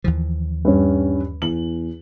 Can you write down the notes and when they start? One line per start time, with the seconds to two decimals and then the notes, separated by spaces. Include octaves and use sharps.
0.04 D#2 E3 F3
0.65 G2 C#4
1.42 E2 F#7